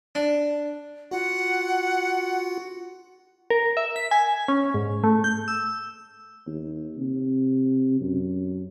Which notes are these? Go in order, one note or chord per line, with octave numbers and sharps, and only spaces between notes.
D4
F4 F#4 F#5
A#4
E5
B6
G#5
C#4
G#2
A3
G6
E6
D#2
C3
F#2